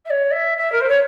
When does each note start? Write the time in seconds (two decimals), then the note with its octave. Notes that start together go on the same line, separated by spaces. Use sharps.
0.05 E5
0.10 C#5
0.31 E5
0.57 E5
0.72 A#4
0.80 C5
0.88 C#5